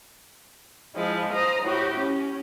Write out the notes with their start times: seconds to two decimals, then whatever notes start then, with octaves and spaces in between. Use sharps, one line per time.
0.94 F3 G#3 E4
1.31 C5 A#5 D#6
1.62 A2 F#4 G4
1.96 C#4